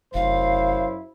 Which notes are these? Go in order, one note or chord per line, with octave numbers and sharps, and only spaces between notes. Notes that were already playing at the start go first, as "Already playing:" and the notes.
F1 F#2 E4 C5 F5